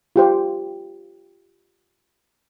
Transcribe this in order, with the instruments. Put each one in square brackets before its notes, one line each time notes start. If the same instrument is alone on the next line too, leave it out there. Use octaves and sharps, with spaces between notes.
[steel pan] F4 G4 C5